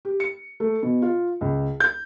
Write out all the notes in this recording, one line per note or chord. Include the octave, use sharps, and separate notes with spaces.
G4
C#7
A3
B2
F4
C#2
G6